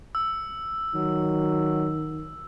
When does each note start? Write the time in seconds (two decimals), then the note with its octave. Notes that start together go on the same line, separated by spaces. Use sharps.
0.15 E6
0.95 D#3 F#3